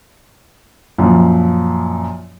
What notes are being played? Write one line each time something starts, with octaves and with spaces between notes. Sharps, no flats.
F#2 A#2 F3